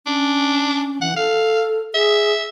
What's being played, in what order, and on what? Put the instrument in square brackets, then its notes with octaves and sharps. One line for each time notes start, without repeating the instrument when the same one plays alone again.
[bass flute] C#4 [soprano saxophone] D4
[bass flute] E3 [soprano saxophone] F#5
[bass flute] A4 [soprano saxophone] F5
[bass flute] G#4 [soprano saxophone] E5